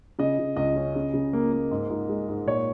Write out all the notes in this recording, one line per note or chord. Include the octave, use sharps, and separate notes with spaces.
C#3 D#5
C#3
C#2 D#5
C#4
C#3
C#3
A#3
A#3
G#2
G#2
G#3
G#2
A#2 C#5